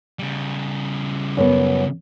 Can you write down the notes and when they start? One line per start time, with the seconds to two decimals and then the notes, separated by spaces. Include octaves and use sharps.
0.19 C#3 G3
1.37 F#2 B3